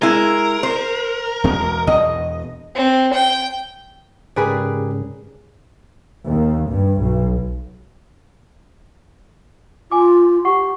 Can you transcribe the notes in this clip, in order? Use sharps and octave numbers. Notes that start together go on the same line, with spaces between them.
G#3 E4 A#4
C5
E2 B2 G#3
E2 B2 D#5
C4
G5
G#2 C#3 G4 G#4 A#4 B4 D5 G#5
D#2
G2
B1
F4 G#5 D6
G4 F#5 C#6